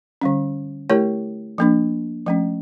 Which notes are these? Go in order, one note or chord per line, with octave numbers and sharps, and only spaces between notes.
D3 G3 C#4
A3 E4 G4 A#4 C#5
F3 A#3 D4
F3 A3 C#4